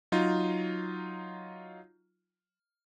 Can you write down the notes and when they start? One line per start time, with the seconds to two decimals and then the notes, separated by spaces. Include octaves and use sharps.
0.12 F#3 D#4 F4